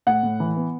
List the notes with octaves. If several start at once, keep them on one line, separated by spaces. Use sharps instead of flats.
A2 F#5
A2
E3
B3